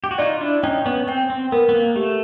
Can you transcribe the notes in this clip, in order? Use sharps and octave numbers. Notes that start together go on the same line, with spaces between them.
G4
F#4
D#4 F4 D5
D4 E4
C#4 D#4 G5
B3 C#4
C4 G5
C4
B3 A#4
B3
A#3
A3 G4